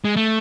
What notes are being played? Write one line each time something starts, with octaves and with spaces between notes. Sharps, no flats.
G#3
A3